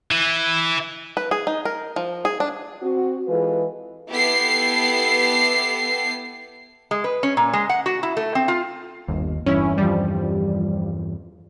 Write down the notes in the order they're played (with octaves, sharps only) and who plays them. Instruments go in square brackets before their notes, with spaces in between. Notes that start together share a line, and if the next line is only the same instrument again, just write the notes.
[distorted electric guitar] E3
[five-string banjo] B4
G#4
D#4
A#4
F3
G#4
D4
[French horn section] C4 F#4
E3 G#3 F4 G#4 A4 B4
[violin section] B3 E4 G4 A4 C7
[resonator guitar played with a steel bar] G#3
B4
C#4
A#2
G#3
F#5
F#4
E4
A3
C4
F4
[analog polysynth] G1 [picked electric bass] D#2
[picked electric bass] E2 G2 E3 [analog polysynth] C#4 E4
[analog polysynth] F3 G3